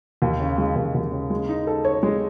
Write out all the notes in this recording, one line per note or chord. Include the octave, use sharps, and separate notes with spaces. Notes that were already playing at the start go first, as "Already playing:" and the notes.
D#2
C#3
G#3
D#2
D#2
C#3
G#3
D#4
A4
C#5
G#3